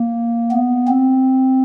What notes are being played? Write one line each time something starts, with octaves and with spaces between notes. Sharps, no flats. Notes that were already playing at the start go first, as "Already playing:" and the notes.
Already playing: A#3
B3
C4